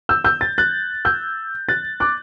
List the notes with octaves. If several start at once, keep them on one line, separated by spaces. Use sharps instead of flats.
E6 G6
E6 G6
A6
F#6 A6
E6 G6
F#6 A6
D6 F#6